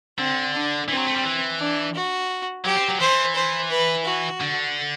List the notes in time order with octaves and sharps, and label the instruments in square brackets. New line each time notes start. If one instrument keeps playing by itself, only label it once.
[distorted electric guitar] D3 [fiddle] C4
[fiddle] D4
[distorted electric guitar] E3 [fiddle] C4
[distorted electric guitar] F#3
A3
G3
E3
[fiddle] D4
F#4
[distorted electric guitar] F#3 [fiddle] G4
[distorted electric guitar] C4
F#3
[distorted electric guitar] E3 [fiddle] C5
[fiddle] C5
B4
F#4
[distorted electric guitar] D3